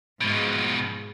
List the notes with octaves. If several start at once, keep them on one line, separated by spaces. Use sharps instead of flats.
G#2 B2 F3 G#3